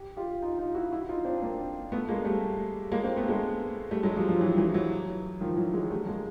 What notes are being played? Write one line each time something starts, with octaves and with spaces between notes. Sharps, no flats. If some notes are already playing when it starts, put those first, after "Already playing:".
Already playing: G4
F4 G4
D#4 F4
D#4 F4
E4 F#4
E4 F#4
D#4 F4
C4 D4
A#3 C4
A3 B3
G#3 A#3
G3 A3
G#3 A#3
A#3 C4
A3 B3
G#3 A#3
G3 A3
F#3 G#3
F3 G3
F3 G3
E3 F#3
E3 F#3
E3 F#3
D#3 F3
E3 F#3
F#3 G#3
G3 A3
G#3 A#3